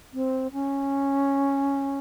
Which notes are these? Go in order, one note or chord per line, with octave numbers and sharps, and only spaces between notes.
C4
C#4